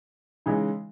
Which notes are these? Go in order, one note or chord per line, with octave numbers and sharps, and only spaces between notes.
C#3 E3 G#3 D#4